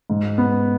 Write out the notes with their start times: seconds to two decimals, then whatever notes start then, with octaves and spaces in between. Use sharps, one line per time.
0.10 G#2
0.38 B3